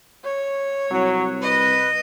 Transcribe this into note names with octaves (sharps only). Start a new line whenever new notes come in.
C#5
C2 F#3
B4 D#5